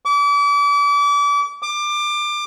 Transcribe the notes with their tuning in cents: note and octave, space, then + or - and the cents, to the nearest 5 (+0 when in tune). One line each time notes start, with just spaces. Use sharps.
D6 -35
D6 +25